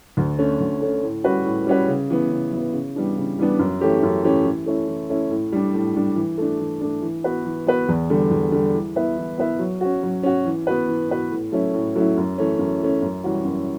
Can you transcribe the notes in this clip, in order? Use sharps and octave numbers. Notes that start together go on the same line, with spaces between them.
D2
D3 A3 C#4
D2
D3 A3 C#4
A2
G3 C#4 F#4 B4
A2
G3 C#4 F#4 B4
C#3
E3 B3
C#3
E3 B3
C#3
E3 G3 B3 D4
C#3
E3 G3 B3 D4
F#2
E3 A3 C#4 G4
F#2
E3 A3 C#4 G4
E3
A3 C#4 E4
E3
A3 C#4 E4
A2
G3 D4
A2
G3 D4
E3
A3 D4
E3
A3 D4
E3
B3 F#4 B4
E3
B3 F#4 B4
E2
D3 G3
E2
D3 G3
E3
B3 E4 B4 E5
E3
B3 E4 B4 E5
F#3
C#4 F#4
F#3
C#4 F#4
E3
B3 F#4 B4
E3
B3 F#4 B4
A2
F#3 A3 C#4 E4
A2
F#3 A3 C#4 E4
F#2
E3 A3 C#4
F#2
E3 A3 C#4
F#2
E3 G3 C#4 F#4
F#2